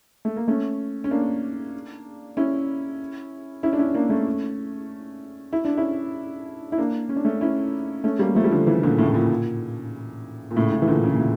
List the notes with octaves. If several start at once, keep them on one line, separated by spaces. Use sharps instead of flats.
A3
A#3
A3 C#4
C#4
A#3 D4
C#4 E4
C#4 E4
D4
C#4 E4
A#3 D4
A3 C#4
E4
D4
C#4 E4
E4
A#3 D4
C#4
D4
A3 C#4
C#4 E4
A3 C#4
G3 A#3
F3 A3
G3
D3 F3
C#3 E3
A#2 D3
A2 C#3
A2
A#2
A#2
A2 C#3
A2 C#3
E3
A#2 D3
C#3
A#2
A2